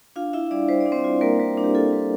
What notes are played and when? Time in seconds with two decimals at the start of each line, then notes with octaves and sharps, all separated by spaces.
0.16 D4 F4 F5
0.33 E4 F4 E5
0.51 G3 D4 D5
0.69 G3 C5
0.80 D5
0.86 D4
0.92 C4 C5
1.04 F4
1.21 G3 A#3 A#4
1.39 G3
1.58 D4
1.64 G4
1.75 F4 A4
1.92 G3